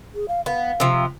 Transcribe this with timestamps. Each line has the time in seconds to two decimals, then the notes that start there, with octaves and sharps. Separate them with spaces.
0.15 G#4
0.28 F5
0.46 B3 F5
0.80 C3 F3